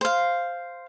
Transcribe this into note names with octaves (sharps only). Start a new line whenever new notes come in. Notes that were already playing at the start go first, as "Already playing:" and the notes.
C5 F5